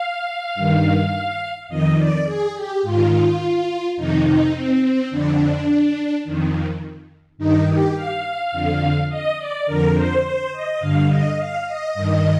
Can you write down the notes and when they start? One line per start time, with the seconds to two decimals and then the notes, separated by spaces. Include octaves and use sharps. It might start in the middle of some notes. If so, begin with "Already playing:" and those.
Already playing: F5
0.55 G2 D#3
1.69 F2 D#3 D#5
1.97 D5
2.25 G#4
2.55 G4
2.82 G#2 D#3 F4
3.97 F2 C3 D#3 D#4
4.25 D#4
4.53 C4
4.82 C4
5.11 F2 D3 D4
6.24 F2 D#3
7.38 G2 D#3 D#4
7.67 G4
7.95 F5
8.52 F2 D3
9.09 D#5
9.38 D5
9.66 F2 D3 A#4
9.94 C5
10.24 C5
10.52 D#5
10.80 G2 D3 F5
11.09 D#5
11.37 F5
11.66 D#5
11.94 G2 D#3